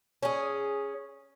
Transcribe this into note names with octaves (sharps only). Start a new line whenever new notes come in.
C#4 G#4